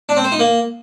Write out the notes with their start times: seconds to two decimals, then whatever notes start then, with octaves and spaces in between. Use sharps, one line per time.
0.09 D4
0.17 C4
0.24 C5
0.32 D#4
0.39 A#3